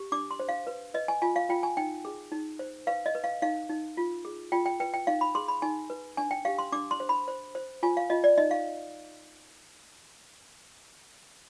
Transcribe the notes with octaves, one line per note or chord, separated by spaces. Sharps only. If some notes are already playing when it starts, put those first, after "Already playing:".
Already playing: G4
D4 D6
C6
C5
F5
B4
B4 D#5
G#5
F4 G#5
F5
F4 G5
G#5
D#4 G5
G#4
D#4
C5
B4 F5
D#5
B4
F5
D#4 F5
D#4
F4
G#4
F4 G5
G5
B4 G5
G5
D#4 F5
B5
G#4 C6
B5
D#4 G#5
B4
D4 G#5
G5
G4 F5
C6
D4 D6
C6
C5
B5
C5
C5
F4 G#5
F5
F4 D#5
D5
D#4 D#5
F5